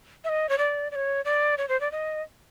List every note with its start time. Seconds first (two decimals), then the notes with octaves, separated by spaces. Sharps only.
0.24 E5
0.29 D#5
0.49 C#5
0.58 D5
0.91 D5
0.95 C#5
1.25 D5
1.58 C#5
1.69 C5
1.81 D5
1.92 D#5